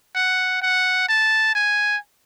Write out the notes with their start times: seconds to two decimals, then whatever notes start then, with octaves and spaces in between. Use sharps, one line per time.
0.15 F#5
0.62 F#5
1.09 A5
1.55 G#5